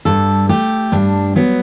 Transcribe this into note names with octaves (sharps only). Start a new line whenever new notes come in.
G2 A4
A3 G4
G2 D4
F#3 B3